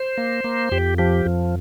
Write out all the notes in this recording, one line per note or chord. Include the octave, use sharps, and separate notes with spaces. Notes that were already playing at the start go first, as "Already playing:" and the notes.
Already playing: C5
A#3
A#3
F2 G4
F3 G4
F2